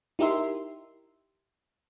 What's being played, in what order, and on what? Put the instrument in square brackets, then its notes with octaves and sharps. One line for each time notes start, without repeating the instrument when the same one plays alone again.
[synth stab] D#4 E4 G4 A#4 E5 C6